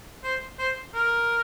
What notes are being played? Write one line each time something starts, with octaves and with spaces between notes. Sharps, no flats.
C5
C5
A#4